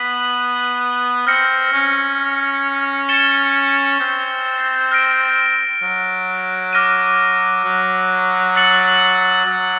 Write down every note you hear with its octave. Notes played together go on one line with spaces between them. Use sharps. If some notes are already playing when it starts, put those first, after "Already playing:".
Already playing: B3 B6 D#7 F#7
C4 F6 A#6 C#7
C#4
A6 C#7 E7 G7
C4
F6 A#6 D7
F#3
D6 F6 A#6 D#7
F#3
E6 A6 C#7 F#7
F#3